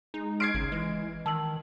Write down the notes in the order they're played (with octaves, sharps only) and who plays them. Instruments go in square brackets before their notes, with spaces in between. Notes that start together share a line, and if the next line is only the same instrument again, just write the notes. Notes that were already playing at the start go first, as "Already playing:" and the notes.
[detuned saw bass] G#3 [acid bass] D#4
[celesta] C6 F6 [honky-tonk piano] G#6 C7 D7
[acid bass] G#1 [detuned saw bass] C#3
[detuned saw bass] E3 [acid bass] G#3
[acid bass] D#3 [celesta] A5 E6 F#7